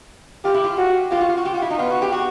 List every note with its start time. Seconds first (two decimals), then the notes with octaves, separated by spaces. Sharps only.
0.45 F4 G4
0.54 E4
0.64 F4
0.78 F#4
1.11 F4 G4
1.21 F#4
1.29 F4
1.37 F#4
1.45 F4 G4
1.54 F#4
1.62 E4
1.70 D#4
1.79 B3 F4
1.91 F#4
2.02 G4
2.12 F#4